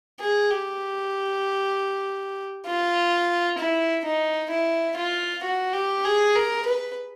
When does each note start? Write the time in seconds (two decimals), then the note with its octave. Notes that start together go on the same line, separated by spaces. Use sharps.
0.20 G#4
0.51 G4
2.66 F4
3.58 E4
4.04 D#4
4.51 E4
4.97 F4
5.43 F#4
5.73 G4
6.04 G#4
6.35 A#4
6.66 B4